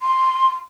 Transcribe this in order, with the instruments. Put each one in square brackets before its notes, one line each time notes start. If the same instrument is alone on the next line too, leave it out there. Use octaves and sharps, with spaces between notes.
[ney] C6